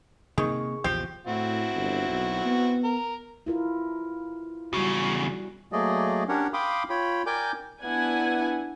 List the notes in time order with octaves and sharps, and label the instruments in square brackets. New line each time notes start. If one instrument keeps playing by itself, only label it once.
[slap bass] C3 A#3 [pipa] D#3 [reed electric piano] G#4 C#6
[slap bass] A#1 E2 C#3 [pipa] F3 G4
[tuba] A2 [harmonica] C4 E4 F#4
[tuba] G1
B1
B3
[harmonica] A#4
[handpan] E4 F4 A#4
[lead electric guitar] E2 C#3 [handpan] G3 F#4
[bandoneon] F#3 A3 A#3 G#4 D5 D#5
C#4 D4 G4 A#4 C#5 F#5
F5 G5 B5 C6 D6 D#6
F4 C#5 G5 B5
A#4 D5 G5 G#5 D6 G6
[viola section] B3 D4 E4 F#5 G#5